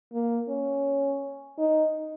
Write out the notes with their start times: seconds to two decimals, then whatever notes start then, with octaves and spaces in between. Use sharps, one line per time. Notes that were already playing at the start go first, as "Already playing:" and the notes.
0.13 A#3
0.49 C#4
1.58 D#4